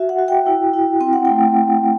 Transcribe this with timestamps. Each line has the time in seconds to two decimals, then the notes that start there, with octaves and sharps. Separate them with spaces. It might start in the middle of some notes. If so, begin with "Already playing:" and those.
Already playing: F#4 E5
0.09 F#5
0.19 F#4
0.28 G5
0.47 E4
0.74 E4
1.00 C4 G5
1.13 F#5
1.25 A3 G5